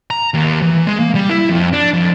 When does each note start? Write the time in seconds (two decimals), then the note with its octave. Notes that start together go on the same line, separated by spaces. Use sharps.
0.10 A#5
0.34 D#2
0.62 E3
0.87 G#3
0.99 A#3
1.15 G3
1.29 E4
1.50 F2
1.73 D4
1.94 F2